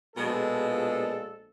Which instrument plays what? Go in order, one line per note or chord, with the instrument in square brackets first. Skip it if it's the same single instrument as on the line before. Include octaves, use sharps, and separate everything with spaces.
[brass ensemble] A#1 A4 [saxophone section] B2 G#3